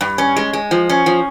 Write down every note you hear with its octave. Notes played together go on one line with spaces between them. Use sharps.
G2
C#4
G#3
G#3
F3
C#4
F3